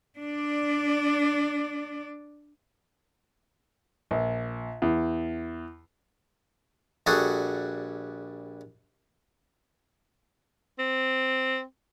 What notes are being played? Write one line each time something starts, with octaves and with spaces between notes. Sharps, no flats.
D4 D5
A#1
E2
A#1 G3 F#4 G#4 A4 F#5
C4